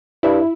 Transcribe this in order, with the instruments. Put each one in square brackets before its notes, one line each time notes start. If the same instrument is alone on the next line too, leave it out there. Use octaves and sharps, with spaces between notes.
[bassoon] G2 [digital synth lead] E4